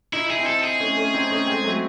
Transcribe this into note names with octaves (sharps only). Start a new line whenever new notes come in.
D#4 E4
E4 G#4
C4 D#4
A4
G#4
A3 C#4
A3 C#4
C4 D#4
A3 C#4
G#3 C4
F#3 A3